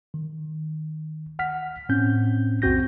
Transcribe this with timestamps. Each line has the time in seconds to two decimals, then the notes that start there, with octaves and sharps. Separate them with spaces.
0.14 D#3
1.39 F#5 F6 B6
1.89 A2 C4 C#4 G6
2.62 B1 F2 C4 F#4 G6 A#6